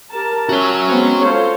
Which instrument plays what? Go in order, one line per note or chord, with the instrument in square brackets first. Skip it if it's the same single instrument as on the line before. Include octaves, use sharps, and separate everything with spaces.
[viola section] G4 A#4 A5
[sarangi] C#4 [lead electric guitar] F#4 C#5 [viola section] E5
[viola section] G#3 B3 C4
[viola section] F4 A4 C#5 [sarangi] C5